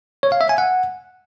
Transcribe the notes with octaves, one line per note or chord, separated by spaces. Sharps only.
C#5
F5
E5
G#5
F#5